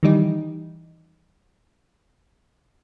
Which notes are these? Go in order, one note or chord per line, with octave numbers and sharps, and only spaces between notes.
D#3 E3 G3 D#4